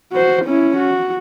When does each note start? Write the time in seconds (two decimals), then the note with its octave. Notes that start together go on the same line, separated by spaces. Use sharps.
0.12 F#4 C5
0.45 C#4 E4
0.77 F#4